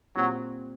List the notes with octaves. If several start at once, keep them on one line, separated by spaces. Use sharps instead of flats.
A#2 F#3 G3 C4